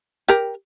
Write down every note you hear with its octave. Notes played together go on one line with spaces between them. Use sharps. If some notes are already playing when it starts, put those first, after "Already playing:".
G4 A#4